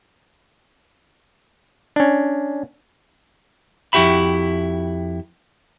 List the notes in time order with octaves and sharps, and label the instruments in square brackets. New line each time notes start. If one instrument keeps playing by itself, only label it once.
[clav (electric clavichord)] C#4 D4
[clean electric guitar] F2 E4 F#4 G4 E5 B5